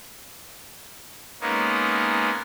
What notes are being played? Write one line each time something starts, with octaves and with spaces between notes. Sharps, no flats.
G#3 A#3 B3 C#4 D#4